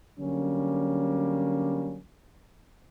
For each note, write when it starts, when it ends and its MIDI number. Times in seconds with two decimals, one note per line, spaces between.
0.19 1.99 50
0.19 1.99 54
0.19 1.99 55
0.19 1.99 58
0.19 1.99 61